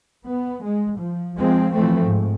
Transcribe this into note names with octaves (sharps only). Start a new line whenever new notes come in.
B3
G#3
F3
F3 G#3 C4
E3 F3 A3 C4
G#2